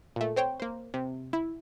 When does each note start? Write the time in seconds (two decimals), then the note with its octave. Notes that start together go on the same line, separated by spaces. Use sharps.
0.16 A#2 A3
0.36 C4 C5 C#5 G5
0.60 A#3 C5
0.94 C3
1.33 E4